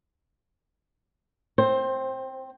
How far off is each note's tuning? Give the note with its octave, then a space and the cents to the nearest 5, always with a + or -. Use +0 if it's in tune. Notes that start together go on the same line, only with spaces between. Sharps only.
C4 +0 C5 +20